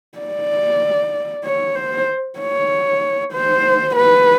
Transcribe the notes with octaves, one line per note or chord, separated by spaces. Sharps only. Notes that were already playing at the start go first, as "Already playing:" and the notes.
D5
C#5
C5
C#5
C5
B4